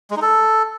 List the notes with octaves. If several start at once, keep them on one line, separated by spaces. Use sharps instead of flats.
G#3
D#4
A4